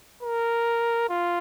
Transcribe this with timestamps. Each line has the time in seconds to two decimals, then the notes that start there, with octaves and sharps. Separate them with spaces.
0.23 A#4
1.09 F4